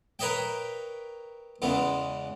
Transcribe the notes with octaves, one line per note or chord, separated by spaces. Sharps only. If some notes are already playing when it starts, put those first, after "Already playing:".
A#4 B4 C#5 D#5 E5 G5
E2 C#3 G#3 B3